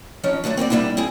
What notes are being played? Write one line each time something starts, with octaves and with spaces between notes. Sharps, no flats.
F2 F3 C#4 D#4 C#5
D3 F#3 A3 D4
C4 F#4 B4 D5
G3 A#3 C4 D4 E4
C4 E4 G#4